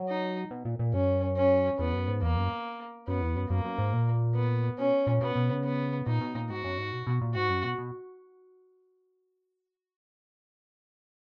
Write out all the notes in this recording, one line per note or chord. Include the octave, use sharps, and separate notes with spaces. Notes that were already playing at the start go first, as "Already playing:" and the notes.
Already playing: F#3
D#4
B2
A#2
A#2
F#2 C#4
C#4
E2 B3
F#2
G#2
E2 A#3
F#2
F#2 B3
E2
F#2
F#2 A#3
F#2
G#2
A#2
B3
B2 C#4
A#2
B2 B3
B2
C#3
B3
A#2 D#4
B2
A#2
G#2 F#4
F#2
G#2
B2
B2
A#2
G#2 F#4
F#2
B2
B2